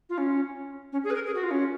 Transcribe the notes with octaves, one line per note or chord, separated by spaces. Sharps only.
F4
C#4
C#4
G#4
B4
A#4
G#4
F#4
F4
C#4